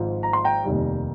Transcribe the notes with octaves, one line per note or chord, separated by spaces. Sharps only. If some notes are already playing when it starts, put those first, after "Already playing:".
Already playing: G#1 G#2 F3
A#5
C6
G5 A#5
F1 D#2 D#3 G3